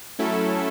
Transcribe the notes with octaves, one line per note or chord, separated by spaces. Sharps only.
F#3 A3 C#4 E4 A4